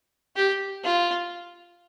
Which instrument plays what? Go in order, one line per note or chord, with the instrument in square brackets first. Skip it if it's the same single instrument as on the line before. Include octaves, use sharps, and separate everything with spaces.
[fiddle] G4
F4